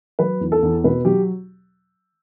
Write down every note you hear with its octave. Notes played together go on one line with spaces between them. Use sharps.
F#3 B4
E2
A4
E2
B2 B4
F#3 G4